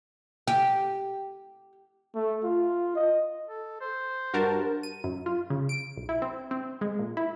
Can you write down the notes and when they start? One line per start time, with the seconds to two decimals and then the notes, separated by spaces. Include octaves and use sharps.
0.47 G4
2.15 A3
2.44 F4
2.96 D#5
3.47 A4
3.81 C5
4.34 G2 F#4 A#4 A5
4.83 D#7
5.04 F#2
5.26 F4
5.50 C#3
5.69 D7
5.97 B1
6.09 E4
6.22 C4
6.51 C4
6.81 G#3
6.99 A#2
7.17 E4